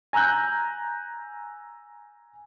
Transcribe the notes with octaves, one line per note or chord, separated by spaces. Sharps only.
G#5 A#5 E6 F#6 G6